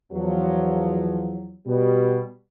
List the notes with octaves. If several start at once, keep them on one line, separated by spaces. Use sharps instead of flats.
E2 F3 F#3
B2 G3